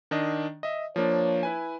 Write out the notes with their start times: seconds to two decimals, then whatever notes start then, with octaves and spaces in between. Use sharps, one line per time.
0.11 D#3 D4 D#5
0.63 D#5 E5
0.96 F3 A#3 D4 C#5
1.43 E4 B4 G#5